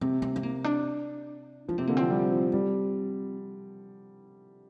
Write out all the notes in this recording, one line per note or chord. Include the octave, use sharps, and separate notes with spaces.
C3 C4
C4
C4
A#3
D4
F3 D4
C3 C4
D3 A#3
F3 C4
G3
F3
G3 C4